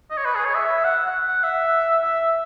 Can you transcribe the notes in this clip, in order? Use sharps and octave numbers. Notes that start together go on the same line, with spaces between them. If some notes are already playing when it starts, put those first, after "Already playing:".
D#5
C#5
B4
G#4
C#5
E5
F#5
F#5
F#5
E5
E5